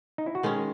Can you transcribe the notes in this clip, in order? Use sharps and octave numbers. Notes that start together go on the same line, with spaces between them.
D#4
E4
F#4
D#3 G#3 C#4 G#4